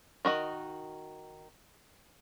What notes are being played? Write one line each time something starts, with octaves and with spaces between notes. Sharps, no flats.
D#3 F#4 D#5